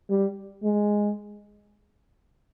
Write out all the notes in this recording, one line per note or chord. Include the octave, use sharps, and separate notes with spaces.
G3
G#3